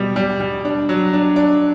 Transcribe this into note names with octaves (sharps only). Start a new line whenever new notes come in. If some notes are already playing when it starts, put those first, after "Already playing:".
Already playing: B2 G3
G3
G3
D4
F#3
D4
D4